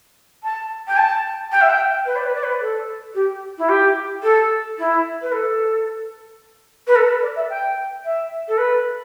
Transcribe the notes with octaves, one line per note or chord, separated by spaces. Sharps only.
A5
G5
A5
G5
E5
G5
B4
D5
B4
D5
B4
A4
G4
E4
G4
A4
E4
B4
A4
B4
A4
B4
D5
E5
G5
E5
A4
B4